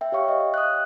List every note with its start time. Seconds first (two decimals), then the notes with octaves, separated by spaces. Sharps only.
0.01 E5 G5
0.12 G4 C#5 F5 C#6
0.28 D#5
0.54 D#6 F#6